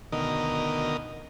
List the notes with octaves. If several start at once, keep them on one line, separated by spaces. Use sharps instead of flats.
D2 B2 D#3 A#4 D#5